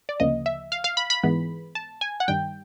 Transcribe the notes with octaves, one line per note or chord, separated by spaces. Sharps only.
D5
D2 C#3 F3 A#3 D#5
E5
F5
F5
B5
B5
G#2 E3 G#3 B3
A5
G#5
F#5
G2 D#3 G3 G5